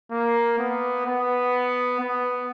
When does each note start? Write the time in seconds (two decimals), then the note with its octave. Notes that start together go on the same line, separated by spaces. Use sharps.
0.11 A#3
0.58 B3
1.06 B3
2.00 B3